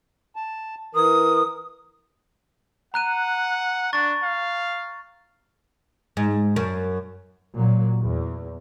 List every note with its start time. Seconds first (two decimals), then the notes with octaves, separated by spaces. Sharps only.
0.36 A5
0.95 E3 A#4 D#6
2.94 F#5 A#5 F#6 D#7
3.93 D4 C#6 A6
4.24 F5
6.17 G#2
6.56 F#2
7.58 A#2 F#3
8.02 E2